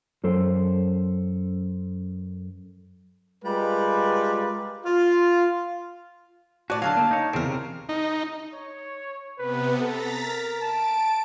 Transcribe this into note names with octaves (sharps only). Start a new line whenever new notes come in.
F#2 A4 C5
G3 G#3 F4 G4 A#4 B4
F4
A2 F#4 D5
D3 F#3 F5 G#5 A5
D3 A#3
D#4 C#5
E2 C#3 C4 A#4
C3
D#4
C#5
C3 B3 B4
A4 A#5 A6 B6
A#4
A5 D7